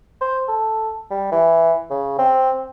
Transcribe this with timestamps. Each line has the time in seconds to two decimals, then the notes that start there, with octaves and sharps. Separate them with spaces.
0.21 C5
0.48 A4
1.11 G3
1.32 E3
1.90 C#3
2.19 C4